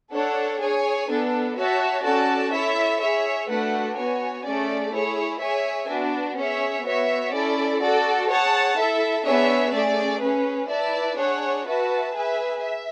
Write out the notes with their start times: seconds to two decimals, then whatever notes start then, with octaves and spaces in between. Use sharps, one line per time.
0.12 D4 A4 C#5 F#5
0.60 G#4 C#5 G#5
1.09 B3 D4 A4
1.56 F#4 C#5 E5 A5
2.04 C#4 F#4 A4 D5 A5
2.52 E4 A4 C#5 E5
3.01 G#4 C#5 E5
3.49 A3 D4 F#4 B4 F#5
3.96 B3 F#4 C#5 G#5
4.45 A3 C#4 G#4 D5
4.93 E4 G#4 C#5
5.41 G#4 C#5 E5 G#5
5.88 B3 D4 F#4
6.37 C#4 G#4 C#5 E5
6.85 B3 F#4 C#5 E5
7.33 C#4 E4 A4 D5
7.82 F#4 A4 D5
8.29 G#4 C#5 F#5 A5
8.77 E4 A4 E5
9.25 B3 D4 G#4 C#5 E5
9.73 A3 C#4 G#4 D5
10.21 C#4 G#4 B4
10.70 E4 B4 D5 A5
11.17 D4 G#4 C#5 F#5
11.65 F#4 B4 E5 A5
12.13 G#4 B4 E5 G#5
12.62 E5